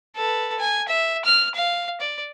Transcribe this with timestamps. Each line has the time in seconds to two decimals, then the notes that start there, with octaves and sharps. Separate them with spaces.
0.16 A4 B4
0.59 G#5
0.88 E5
1.25 F6
1.55 F5
2.01 D5